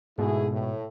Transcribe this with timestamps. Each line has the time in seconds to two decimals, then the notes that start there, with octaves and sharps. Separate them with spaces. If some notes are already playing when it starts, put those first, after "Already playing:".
0.18 G#2 B2 A3 E4 G#4
0.53 A2